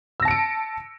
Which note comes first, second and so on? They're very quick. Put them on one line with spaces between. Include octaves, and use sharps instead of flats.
E6 A#6 A5 C#7 D7